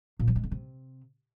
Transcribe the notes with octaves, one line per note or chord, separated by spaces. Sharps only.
A#2
F3
G#3
D3
C3